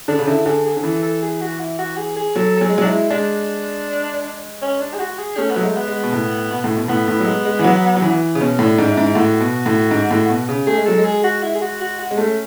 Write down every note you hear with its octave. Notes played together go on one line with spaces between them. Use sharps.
D3 D4
C#3
D3 E4
D3 G#4
G#4
D3
E3 A4
A4
G#4
F#4
E4
F#4
G#4
G#4
F#3 A4
A4
F#3 G#4
G#3
F#3
D4
G#3 E4
G#3 D4
C#4
D4
G#4
F#4
F#4
G#4
A3 C#4
B3
F#3
G#3 A3
B3
G#3
B2
A2
B2
A2
B2
A2 B3
A2
F#3
G#3
G#3
E3
F#3
F#3
E3
C#3
B2 C#4
A2
D4
G#2
E4
G#2
E4
A2 F#4
B2
A2
G#2
A2
B2
C#3
A3 G#4
G#3
F#3 A4
G#3
G#4
F#4
E4
G#4
F#4
F#4
F#4
G#3
A3 C#4